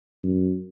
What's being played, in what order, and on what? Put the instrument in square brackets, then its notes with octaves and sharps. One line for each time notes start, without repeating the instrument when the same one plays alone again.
[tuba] F#2